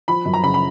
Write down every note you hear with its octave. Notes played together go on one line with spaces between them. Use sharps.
F3 B5
F#2
A#5
C#3 B5
B5